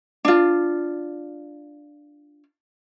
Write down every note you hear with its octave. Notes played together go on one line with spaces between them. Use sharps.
D4 F4